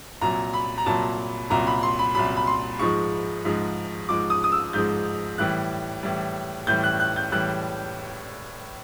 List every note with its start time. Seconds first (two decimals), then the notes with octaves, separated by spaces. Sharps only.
0.21 C2 A#2 F#3 A#5
0.54 B5
0.78 A#5
0.86 C2 A#2 F#3 A5
1.50 C2 A#2 F#3 A#5
1.67 B5
1.83 C6
1.99 B5
2.15 C2 A#2 F#3 B5
2.36 B5
2.47 C6
2.79 G#2 F3 G#3 C#6
3.45 G#2 F3 G#3
4.09 G#2 F3 G#3 D6
4.30 D#6
4.44 D#6
4.52 E6
4.73 G#2 F3 G#3 G6
5.38 A2 E3 G3 F#6
6.03 A2 E3 G3
6.67 A2 E3 G3 G6
6.83 F#6
7.00 F#6
7.16 G6
7.32 A2 E3 G3 F#6